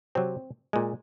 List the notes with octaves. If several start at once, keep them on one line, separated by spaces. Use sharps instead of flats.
C3 F#3 C4
A#2 G#3